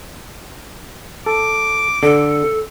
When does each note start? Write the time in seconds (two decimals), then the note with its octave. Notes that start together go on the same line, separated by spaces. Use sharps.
1.26 A4 D6
2.03 D3 A4